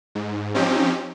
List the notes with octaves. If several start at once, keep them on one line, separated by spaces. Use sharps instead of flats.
G#2
F3 C4 C#4 D#4 G4